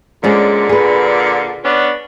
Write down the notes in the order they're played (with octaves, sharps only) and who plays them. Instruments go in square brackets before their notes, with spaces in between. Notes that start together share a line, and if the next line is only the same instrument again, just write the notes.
[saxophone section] A#2 D3 [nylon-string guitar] G#3 C#4 C5
[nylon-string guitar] G#4 B4
[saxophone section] B3 C#4 D4